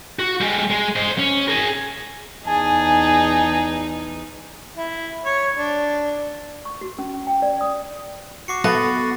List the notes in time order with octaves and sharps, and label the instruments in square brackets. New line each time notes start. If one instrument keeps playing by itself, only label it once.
[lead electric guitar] F#4
G3 G#3
G#3
C5 D#5
C#4
G#4 A#4
[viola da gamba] E2 D#4 [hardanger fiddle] G#4 [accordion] G#5 A5
[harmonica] E4
C#5
D4
[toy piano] C#6
F#4
C#4
C#4
G5
D5
D#6
[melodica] F#4 [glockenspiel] D6 C7 C#7
[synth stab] A3 [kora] B3 [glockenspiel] A6 A#6